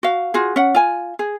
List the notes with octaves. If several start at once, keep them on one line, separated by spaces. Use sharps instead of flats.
F#4 F5
F4 F#4 G#4
C#4 F#5
F4 G#5
G#4